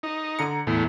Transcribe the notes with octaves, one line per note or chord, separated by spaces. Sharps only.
D#4
D3 A#5 C#7
E2 A2